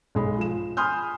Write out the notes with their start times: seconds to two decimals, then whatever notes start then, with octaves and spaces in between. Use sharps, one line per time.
0.15 B1 G#3 B5
0.39 F3 E7
0.77 G#5 B5 C6 D#6 F6 G6